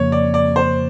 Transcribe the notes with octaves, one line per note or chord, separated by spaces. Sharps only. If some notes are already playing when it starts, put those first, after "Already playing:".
Already playing: F2 C#3 F3 A#3 C#5
D5
D5
C5